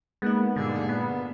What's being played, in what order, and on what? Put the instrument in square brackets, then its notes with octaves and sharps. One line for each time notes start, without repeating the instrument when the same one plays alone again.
[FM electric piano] G#3 A#3 D#4 [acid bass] B3
[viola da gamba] G2 A#2 G#4 [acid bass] D3
[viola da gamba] A#2 [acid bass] B3